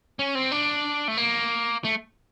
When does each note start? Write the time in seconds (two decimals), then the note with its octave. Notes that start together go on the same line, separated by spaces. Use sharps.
0.19 C#4
0.35 C4
0.52 D4
1.08 A3
1.17 A#3
1.84 A3